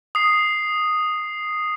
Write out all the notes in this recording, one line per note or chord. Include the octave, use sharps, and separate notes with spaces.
D#6 C7